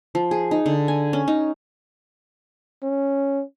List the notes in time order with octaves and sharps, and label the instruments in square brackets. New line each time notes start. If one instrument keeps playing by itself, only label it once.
[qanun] F3
G#4
D#4
D3
G#5
C#4
D#4
[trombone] C#4